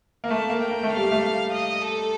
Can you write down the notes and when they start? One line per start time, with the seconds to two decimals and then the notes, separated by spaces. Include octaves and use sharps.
0.24 A#3
0.29 A3 A5
0.50 A#3
0.60 G5
0.70 A#3
0.83 A3
0.90 F5
0.97 G3
1.11 A3
1.52 D#5
1.82 A4